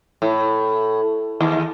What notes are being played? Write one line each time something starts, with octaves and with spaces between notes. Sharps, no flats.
A2
D#2